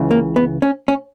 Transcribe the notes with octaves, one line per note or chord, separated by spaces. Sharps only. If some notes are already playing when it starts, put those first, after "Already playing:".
Already playing: C#2 C#3 E3
A#3
B3
C#4
C#4